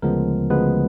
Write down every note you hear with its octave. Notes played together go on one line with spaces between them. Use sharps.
D2 C#3 F3 G#3 B3 A#4
D2 C#3 F3 G#3 B3 B4